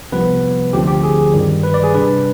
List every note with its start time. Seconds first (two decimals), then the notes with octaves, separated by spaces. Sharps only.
0.12 C2 C3 F3 B3 B4
0.73 D2 D3 F3 C4 G4
0.88 G4
1.03 G#4
1.33 G2 D#3 G3
1.63 B4
1.74 D5
1.84 G#4
1.94 C3 G3 D4 B4